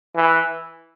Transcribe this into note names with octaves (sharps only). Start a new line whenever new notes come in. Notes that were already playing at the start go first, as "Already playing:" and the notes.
E3